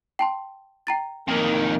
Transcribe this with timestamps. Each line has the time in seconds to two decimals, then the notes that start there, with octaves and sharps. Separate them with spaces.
0.19 G5 A5 C6
0.87 G5 A#5 A6
1.28 F2 D#3 A#3